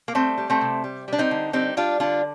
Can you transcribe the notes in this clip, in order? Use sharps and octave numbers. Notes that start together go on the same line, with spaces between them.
A#3
G3 A3 C4
G3
A3 C4
C3
G3
G3 D4
C4 D#4
D3
G3 C4 D#4
G3 D4 F4
D3 D4 F4